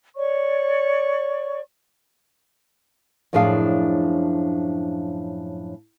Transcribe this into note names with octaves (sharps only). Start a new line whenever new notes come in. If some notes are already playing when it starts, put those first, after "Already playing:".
C#5 D5 C#6
F#2 A2 F3 D4 G#4 F5